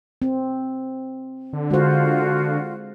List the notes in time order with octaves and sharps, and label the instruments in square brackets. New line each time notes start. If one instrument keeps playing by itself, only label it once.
[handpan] C4
[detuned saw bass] D3
[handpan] G#3 C5 [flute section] F4 F#4